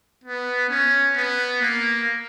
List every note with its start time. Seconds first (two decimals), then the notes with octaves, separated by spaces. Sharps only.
0.24 B3
0.70 C#4
1.16 B3
1.62 A#3